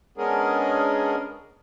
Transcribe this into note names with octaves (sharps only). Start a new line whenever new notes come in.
G#3 B3 C#4 D4 G#4 A#4